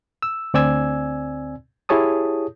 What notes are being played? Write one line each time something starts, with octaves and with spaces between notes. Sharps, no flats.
E6
D2 C4 D5 G#5 E6 G#6
E4 G4 G#4 C#5 A5 D#6